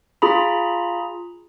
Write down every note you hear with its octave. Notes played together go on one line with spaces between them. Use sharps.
F4 G#4 A#5 B5